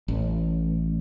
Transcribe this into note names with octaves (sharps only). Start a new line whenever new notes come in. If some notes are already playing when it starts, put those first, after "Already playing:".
A1